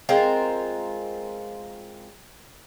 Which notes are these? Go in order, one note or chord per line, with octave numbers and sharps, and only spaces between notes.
G#3 C4 F4 A#4